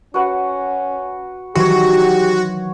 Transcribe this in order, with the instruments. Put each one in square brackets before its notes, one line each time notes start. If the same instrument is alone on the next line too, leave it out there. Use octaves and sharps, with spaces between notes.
[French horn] C#4 [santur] F#4 B4 F#5
[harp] D#3 E3 F#3 [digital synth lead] F#4 [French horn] G4 [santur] C#5 C6